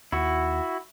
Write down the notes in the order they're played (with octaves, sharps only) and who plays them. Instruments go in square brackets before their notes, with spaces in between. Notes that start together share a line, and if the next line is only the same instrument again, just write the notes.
[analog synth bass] D#2 [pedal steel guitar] E4 F#4